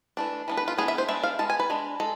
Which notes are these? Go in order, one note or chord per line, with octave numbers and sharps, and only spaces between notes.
E3 A3 D4
E3 B3 D4
B4
F4
E3 B3 D4 G#4
E5
C5
G#3 B3 D4 E5
F5
G#3 B3 A5
G#5
B4
G#3 D4
G#3 A4